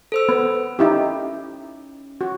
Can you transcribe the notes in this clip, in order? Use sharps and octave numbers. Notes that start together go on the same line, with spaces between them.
A4 C5 E6
B3
C#4 D#4 E4 G4
F#4